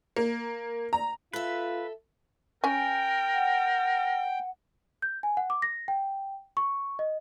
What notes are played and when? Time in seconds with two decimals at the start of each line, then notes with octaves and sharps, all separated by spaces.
0.16 A#3
0.93 A#5
1.33 F4 A4 B4 E5
2.64 C#4 A#4 G5 G#5
3.34 F#5
5.02 G6
5.23 G#5
5.37 F#5
5.50 D6
5.62 A#6
5.88 G5
6.57 C#6
6.99 D#5